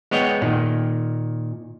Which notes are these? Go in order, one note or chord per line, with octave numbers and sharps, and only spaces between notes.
G#3 B3 C#5 D#5 F#5 G5
A#2 D#3